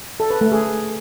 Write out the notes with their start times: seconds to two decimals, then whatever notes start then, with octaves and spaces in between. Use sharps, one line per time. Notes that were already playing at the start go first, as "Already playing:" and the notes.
0.20 A4
0.30 B4
0.41 A3
0.52 G#4